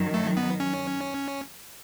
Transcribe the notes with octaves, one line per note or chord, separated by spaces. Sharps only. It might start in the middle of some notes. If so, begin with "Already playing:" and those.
Already playing: F#2 D#3 F#3
A3
B3
C#4